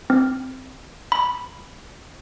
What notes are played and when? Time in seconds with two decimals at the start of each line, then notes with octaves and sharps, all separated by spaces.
0.10 C4
1.12 B5